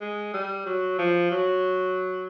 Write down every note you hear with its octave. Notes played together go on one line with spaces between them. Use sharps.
G#3
G3
F#3
F3
F#3